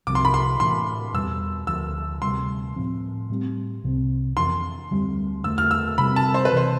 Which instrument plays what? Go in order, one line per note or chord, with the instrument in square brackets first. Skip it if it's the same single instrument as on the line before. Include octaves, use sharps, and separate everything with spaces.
[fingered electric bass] C2 C3 F3 C4 [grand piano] D6
[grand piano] C6
B5
C6
[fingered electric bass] A2 E3 B3 D4 [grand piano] C6
[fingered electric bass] E2 B2 G3 B3 [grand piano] E6
[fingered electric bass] D2 D3 F3 [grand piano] E6
[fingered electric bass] D2 C3 G3 [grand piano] C6
[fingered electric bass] A2 F3 C4
A2 G3 C4
C2 C3 F3 C4
[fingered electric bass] F2 E3 B3 D4 [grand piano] C6
[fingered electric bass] D2 D3 G3 C4
[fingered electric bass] E2 D3 A3 [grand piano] E6
[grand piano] F6
E6
[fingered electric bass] C3 G3 C4 [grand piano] B5
[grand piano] A5
C5
B4
[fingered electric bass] C3 E3 [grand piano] C5